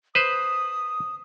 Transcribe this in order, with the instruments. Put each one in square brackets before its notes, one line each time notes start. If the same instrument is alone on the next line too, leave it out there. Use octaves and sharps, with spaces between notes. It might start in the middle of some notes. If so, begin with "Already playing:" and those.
[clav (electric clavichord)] B4 C5 [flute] D#6